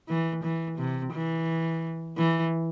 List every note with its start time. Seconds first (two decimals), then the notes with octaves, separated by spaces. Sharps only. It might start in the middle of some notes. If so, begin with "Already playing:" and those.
0.08 E3
0.43 E3
0.78 C3
1.13 E3
2.18 E3